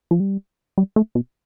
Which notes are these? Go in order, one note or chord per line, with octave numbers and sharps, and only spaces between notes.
F3
G3
G3
A3
B2